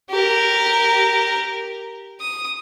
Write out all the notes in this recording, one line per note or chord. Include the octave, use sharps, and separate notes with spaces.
G4 A#4
D#6